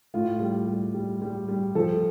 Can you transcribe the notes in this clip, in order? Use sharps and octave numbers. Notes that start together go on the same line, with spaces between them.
A2 F4
G3
G3
G3
G3
G3
F3 A4